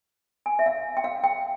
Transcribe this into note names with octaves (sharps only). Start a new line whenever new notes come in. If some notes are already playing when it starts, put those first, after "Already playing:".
G#5
E5
F5
G5
F5
G5